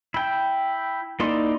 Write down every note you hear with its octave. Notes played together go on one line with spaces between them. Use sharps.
E4 G5
A#3 D#4 E4 D5 C6